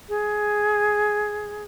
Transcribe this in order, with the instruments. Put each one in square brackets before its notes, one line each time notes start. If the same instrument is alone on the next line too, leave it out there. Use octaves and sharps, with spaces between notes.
[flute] G#4